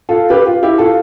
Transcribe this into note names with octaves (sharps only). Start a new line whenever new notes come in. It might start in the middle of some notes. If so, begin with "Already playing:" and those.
F4 A4
G4 B4
F4
E4 G4
F4 A4